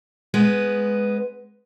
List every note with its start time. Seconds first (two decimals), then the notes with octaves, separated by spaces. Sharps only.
0.34 G#3 B3 B4